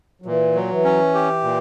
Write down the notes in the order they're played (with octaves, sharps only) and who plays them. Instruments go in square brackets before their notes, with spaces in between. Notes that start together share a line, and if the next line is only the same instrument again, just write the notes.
[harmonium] F#3
[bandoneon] A#2 [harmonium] E3
[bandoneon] F#3
[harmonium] E3
[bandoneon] C#4
G4
A#2